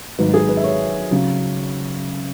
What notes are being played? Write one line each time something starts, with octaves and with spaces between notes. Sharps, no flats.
G#1 G#2 F#3 B4
G#4
B4
E5
C#5
C#3 F#3